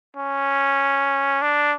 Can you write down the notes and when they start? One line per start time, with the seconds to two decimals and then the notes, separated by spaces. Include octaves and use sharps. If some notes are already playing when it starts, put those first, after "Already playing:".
0.16 C#4
1.42 D4